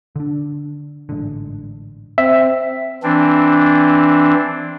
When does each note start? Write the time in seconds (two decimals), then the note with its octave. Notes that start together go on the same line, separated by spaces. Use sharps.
0.16 D3 D4
1.09 A1 G#2 D3
2.18 C4 E5
3.03 E3 C4 D4